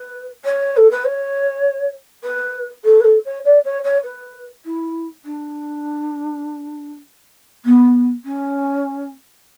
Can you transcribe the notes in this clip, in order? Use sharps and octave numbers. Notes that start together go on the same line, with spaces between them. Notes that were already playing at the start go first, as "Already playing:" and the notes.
Already playing: B4
C#5
A4
B4
C#5
B4
A4
B4
A4
C#5
D5
C#5
C#5
B4
E4
D4
B3
C#4